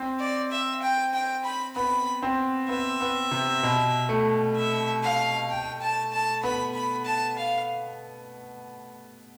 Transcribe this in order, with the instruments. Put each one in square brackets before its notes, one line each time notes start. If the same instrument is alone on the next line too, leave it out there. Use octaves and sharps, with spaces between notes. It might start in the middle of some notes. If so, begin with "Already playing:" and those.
Already playing: [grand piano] C4
[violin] D5
E5
G5
G5
B5
[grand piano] B3 [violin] B5
[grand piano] C4
[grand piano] B3 [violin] E5
[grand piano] B3
C3
B2
A3
[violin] E5
F5
G5
A5
A5
[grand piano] B3 [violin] B5
[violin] B5
A5
F5